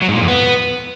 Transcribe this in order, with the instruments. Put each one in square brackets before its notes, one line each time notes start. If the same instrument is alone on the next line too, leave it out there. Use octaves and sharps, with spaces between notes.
[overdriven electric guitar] F#3
G#2
A#2
F2
B3